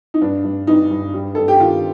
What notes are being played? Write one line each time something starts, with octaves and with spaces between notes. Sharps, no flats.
D#4
G2 D4
G2
G2 D#4
G2
G3
G2 A4
G4
D#3 F4